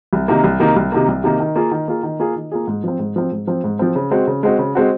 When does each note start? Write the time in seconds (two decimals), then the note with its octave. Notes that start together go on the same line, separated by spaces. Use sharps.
0.13 C2
0.28 C3 D#3 A#3
0.44 C2
0.60 C3 D#3 A#3
0.76 C2
0.92 C3 D#3 A#3
1.08 C2
1.24 C3 D#3 A#3
1.40 D#3
1.56 A#3 F4 G#4
1.72 D#3
1.88 A#3 F4 G#4
2.03 D#3
2.20 A#3 F4 G#4
2.36 D#3
2.52 A#3 F4 G#4
2.67 G#2
2.84 F3 C4
2.99 G#2
3.16 F3 C4
3.32 G#2
3.47 F3 C4
3.64 G#2
3.79 F3 C4
3.95 C#3
4.11 G#3 C4 F#4
4.27 C#3
4.43 G#3 C4 F#4
4.59 C#3
4.75 G#3 C4 F#4